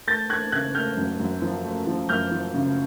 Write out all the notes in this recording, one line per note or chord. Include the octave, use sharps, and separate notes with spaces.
A3 G6 A6
A3 F#6 G#6
C#3 F#6 G#6
A3 F6 G6
F#2
F#2
F3
A3
F3
F#2 F6 G6
F3
C#3